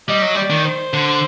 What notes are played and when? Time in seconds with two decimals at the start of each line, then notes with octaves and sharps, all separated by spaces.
0.09 G3 D#5
0.22 F#3
0.35 G3 D5
0.50 D#3
0.65 C5
0.93 D3